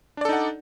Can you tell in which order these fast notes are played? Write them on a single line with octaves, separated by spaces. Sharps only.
D4 D5 A4 D#4 F#5